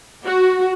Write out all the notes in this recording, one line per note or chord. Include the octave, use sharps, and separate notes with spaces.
F#4